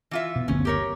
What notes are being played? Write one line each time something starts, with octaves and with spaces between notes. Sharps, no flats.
E3 F4 E5
B2
F#1 D2 B3 C#4
G4 A#4 C#5